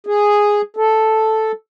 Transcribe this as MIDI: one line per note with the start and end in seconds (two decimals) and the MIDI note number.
0.07 0.62 68
0.77 1.52 69